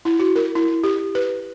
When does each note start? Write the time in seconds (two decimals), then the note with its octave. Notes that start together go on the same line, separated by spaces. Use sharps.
0.05 E4
0.19 F#4
0.36 A#4
0.55 E4
0.84 G4
1.15 B4